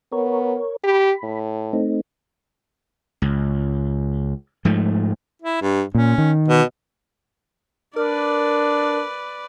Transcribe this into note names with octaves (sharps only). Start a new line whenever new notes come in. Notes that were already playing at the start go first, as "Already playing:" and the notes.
B3 A#4 C#5
G4 B5
A2
A3 C4 D#4
C#2
G#2 F3 A3
E4
G2
A#2 C#4
D#3
B2
D4 A#4 B4 D5